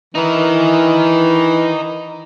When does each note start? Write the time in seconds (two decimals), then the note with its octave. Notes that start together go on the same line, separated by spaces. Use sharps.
0.15 E3 D#4 A#4